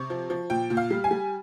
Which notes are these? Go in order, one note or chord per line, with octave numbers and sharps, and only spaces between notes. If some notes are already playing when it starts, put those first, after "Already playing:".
Already playing: C3 C#6
F3
F3
A#2 G5
A#2
F5
G3
G#5
G3